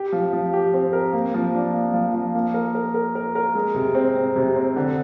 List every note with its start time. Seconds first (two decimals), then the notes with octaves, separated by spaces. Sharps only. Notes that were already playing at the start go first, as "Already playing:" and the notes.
Already playing: G4
0.12 F3
0.33 F3
0.53 G4
0.74 C4
0.93 A#4
1.13 A#3
1.34 F3
1.54 D4
1.73 A#3
1.94 F3
2.14 F3
2.34 A#3
2.54 A#4
2.75 A#4
2.94 A#4
3.15 A#4
3.35 A#4
3.55 G#3
3.74 C3
3.95 C4
4.16 C4
4.36 C3
4.56 C4
4.76 D3